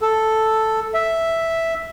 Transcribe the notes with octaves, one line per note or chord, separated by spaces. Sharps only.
A4
E5